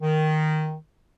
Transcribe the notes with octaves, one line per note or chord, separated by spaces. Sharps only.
D#3